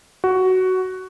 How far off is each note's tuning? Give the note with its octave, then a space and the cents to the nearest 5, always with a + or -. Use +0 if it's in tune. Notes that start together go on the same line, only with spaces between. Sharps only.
F#4 +10